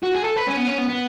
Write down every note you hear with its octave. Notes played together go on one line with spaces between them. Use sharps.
F#4
G#4
A4
B4
C#4
B3
C#4
B3
B3